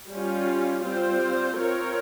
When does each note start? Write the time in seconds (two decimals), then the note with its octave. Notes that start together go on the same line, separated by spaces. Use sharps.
0.12 G3 C#4 F4
0.86 G3 C4 F4 C5
1.59 C4 F4 A#4 C#5